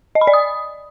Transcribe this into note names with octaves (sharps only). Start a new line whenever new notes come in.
D#5
B5
D5
D#6